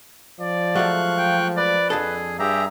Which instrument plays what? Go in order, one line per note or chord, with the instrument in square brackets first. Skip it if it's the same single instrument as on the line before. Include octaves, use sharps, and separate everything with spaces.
[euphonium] F3 [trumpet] D5
[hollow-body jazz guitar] F#3 G#3 A3 [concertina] F5 C#6 F#6
[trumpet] G5
[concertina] B4 [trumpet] D5
[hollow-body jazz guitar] F2 D4 A4 [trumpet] G#4
[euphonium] G2 [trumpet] G4 [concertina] G#4 E5 A#5